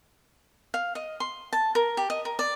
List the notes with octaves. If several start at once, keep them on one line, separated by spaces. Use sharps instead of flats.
F5
D#5
C6
A5
A#4
G4
D#5
A#4
D5